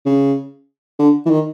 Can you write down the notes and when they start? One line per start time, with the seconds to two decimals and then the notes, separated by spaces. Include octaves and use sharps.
0.06 C#3
0.99 D3
1.26 E3
1.30 D#3